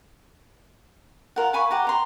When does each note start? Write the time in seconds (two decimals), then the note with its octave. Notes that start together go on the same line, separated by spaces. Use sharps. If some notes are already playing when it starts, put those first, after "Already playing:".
1.36 F4 A#4 F#5
1.53 F5 G#5 B5 C#6
1.71 G4 F#5 A#5
1.85 C5 A#5 C6